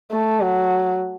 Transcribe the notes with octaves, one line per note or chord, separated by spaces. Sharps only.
A3
F#3